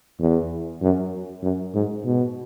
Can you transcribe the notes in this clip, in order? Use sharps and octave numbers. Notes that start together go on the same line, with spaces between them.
E2
F#2
F#2
G#2
B2